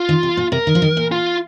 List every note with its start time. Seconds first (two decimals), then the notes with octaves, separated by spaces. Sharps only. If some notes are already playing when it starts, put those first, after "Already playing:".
Already playing: F4
0.09 D#3
0.23 C3
0.37 A#2
0.52 C3 A#4
0.67 D#3
0.75 F3
0.82 D#3
0.97 A#2
1.12 F4